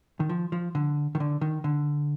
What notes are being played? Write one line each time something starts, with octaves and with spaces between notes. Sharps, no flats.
D#3
F3
F3
D3
D#3
D3
D#3
D3